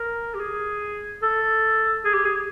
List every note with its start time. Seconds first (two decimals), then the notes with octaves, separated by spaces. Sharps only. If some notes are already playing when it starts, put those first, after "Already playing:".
Already playing: A#4
0.35 G4
0.40 G#4
1.22 A4
2.05 G#4
2.14 G4
2.25 G#4